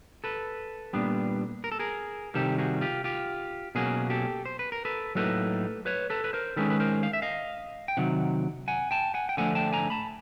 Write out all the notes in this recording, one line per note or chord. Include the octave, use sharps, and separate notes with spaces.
A4 B4
A#2 G3 B3 D4
A#4
A4
G#4 A#4
C3 D#3 G3 G4 A4
F#4 G#4
F4 G4
F4 G4
B2 F#3 A#3 C#4 F#4 G#4
G4 A4
C5
B4
A#4
A4 B4
A2 F#3 A#3 D#4 A4 B4
B4 C#5
A4 B4
B4
A#4 C5
D#3 G#3 C#4 A4 B4
B4
A#4 C5
F5
E5
D#5 F5
G5
C3 D#3 F#3 F#5
F#5 G#5
G5 A5
F#5 G#5
G5
D3 F3 A3 D4 F#5 G#5
G5 A5
G#5 A#5
A5 B5